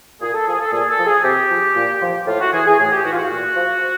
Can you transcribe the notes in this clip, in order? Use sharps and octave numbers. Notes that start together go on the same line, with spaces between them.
A#2 G#4
A4
F3 G#4
A4
A#2 G#4
A4
F3
G#4
C3 G4
F3
A#2
F3
A2 F4
F#4
E3 G#4
G#4
A2 G#4
G4
E3 F#4
F4
F#4
A#2
F3